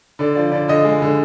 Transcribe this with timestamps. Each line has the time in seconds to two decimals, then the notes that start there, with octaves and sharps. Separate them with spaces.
0.19 D3 D5
0.35 F3 D5
0.52 D3 D5
0.68 D3 D#5
0.85 G#3
1.02 D3